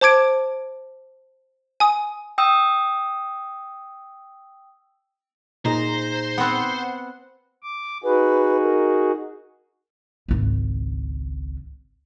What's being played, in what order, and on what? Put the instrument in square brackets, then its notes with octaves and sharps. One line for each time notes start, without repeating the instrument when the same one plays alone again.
[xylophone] C5 A5 D6 G#6 D7
G#5 D#6
[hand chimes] G5 D#6 E6
[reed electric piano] A#2 D#4 G#4 [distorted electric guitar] C5 [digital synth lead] A#5
[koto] B3 C4 [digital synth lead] F#5
[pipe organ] D6
[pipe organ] D#4 F#4 G#4 [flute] B4
[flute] A#4
[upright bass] G#1 C#2